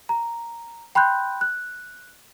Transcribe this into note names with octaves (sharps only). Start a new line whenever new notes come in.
A#5
G5 B5 C6 F#6 G6
F#6